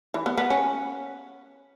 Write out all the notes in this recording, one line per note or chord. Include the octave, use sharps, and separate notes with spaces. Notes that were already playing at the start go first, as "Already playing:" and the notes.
E3
B3
B3
C#4